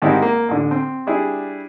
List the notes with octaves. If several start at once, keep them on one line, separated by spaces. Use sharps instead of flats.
G#2 D#3 G3 C4 E4
A#3
A1 D3
C4
G3 D4 E4 G#4